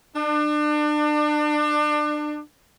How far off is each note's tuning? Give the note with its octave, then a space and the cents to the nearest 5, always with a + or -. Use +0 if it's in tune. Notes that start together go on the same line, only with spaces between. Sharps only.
D4 +30